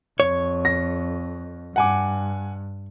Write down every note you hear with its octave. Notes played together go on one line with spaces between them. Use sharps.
F2 C#5
A#6
G2 F#5 G#5 D6